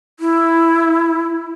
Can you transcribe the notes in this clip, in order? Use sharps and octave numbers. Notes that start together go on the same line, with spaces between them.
E4